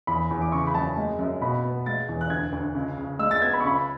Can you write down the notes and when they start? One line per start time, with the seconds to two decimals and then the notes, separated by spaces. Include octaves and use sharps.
0.07 E2 B5
0.31 E2
0.41 D6
0.52 C#3 C#6
0.67 B5
0.74 F#2 A5
0.97 G#3
1.19 F#2
1.41 B2 B5
1.64 B3
1.86 G#3 A6
2.09 E2
2.21 F#6
2.30 D2 G#6
2.52 D2
2.75 C#2
2.98 C#3
3.19 G#3 E6
3.31 A6
3.41 B3 G#6
3.53 B5
3.60 C#6
3.65 C#2 B5